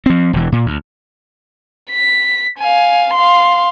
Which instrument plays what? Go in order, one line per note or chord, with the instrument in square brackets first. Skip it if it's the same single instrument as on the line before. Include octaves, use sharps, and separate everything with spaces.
[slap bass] F3 C4
E1 E3
A#2
D2
[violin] B6
F5 G#5
F5 C6